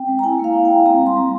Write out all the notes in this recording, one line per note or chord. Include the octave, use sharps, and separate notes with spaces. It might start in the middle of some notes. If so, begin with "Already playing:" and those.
Already playing: C4 G5
G#3
A#5
E4 G#5
A#3
F5
E4
G5
E4
C4 A#5
G3
C6
G3